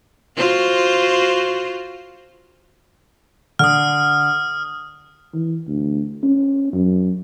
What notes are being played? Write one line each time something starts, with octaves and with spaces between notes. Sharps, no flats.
F4 F#4 C5
D3 D#6 F6
E3
D2
C#4
F#2